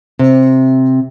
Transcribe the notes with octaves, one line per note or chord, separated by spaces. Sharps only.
C3